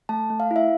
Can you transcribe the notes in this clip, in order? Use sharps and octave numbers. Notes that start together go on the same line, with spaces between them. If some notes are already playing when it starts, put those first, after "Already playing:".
A3 A5
A3
F5
E4
E5